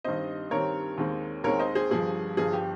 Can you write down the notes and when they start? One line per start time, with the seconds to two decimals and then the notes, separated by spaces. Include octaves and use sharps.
0.04 G2 D#3 G3 C4 C5 D#5
0.51 G2 D#3 G3 C4 A#4 C#5
0.98 D#2 D#3 G#3 C4
1.44 D#2 D#3 G#3 C4 A#4 C#5
1.59 C5 D#5
1.75 G#4 C5
1.91 G1 G2 F3 G#4
2.37 G1 G2 F3 G#4
2.53 G4